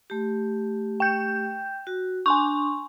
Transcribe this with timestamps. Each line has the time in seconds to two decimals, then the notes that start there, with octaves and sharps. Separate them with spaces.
0.10 A3 G4
1.00 G5 G6
1.87 F#4
2.26 D4 G#5 C6 C#6